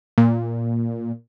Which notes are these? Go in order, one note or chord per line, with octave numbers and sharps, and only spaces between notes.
A#2